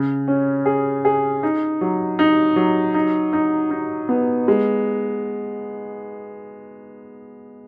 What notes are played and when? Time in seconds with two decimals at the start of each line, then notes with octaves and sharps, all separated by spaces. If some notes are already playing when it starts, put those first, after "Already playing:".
Already playing: C#3
0.28 C#4
0.66 G#4
1.05 G#4
1.43 D#4
1.81 F#3
2.19 D#4
2.56 F#3
2.94 D#4
3.33 D#4
3.71 D#4
4.09 B3
4.48 G#3